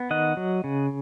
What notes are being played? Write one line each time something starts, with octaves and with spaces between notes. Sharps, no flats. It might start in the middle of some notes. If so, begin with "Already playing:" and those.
Already playing: B3
D#3 D#5 F#5
F#3
C#3